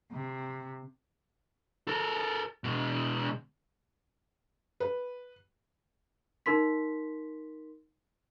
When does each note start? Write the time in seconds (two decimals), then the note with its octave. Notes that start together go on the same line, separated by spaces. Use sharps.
0.12 C3
1.88 A4 A#4
2.64 B2 G#3
4.80 B4
6.46 D#4 A#4 C6 B6